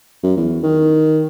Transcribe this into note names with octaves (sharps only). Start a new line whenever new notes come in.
F#2
E2
D#3